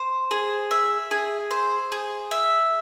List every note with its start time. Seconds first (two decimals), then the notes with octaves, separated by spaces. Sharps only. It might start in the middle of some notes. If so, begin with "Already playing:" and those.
Already playing: C5
0.31 G#4
0.71 E5
1.11 G#4
1.51 C5
1.92 G#4
2.31 E5